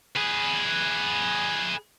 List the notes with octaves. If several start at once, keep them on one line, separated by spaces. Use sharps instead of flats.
G#4 B4